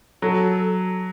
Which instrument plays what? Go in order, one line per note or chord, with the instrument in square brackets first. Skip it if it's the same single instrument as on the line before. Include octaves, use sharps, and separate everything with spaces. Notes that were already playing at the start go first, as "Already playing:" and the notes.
[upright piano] F#3 [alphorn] A4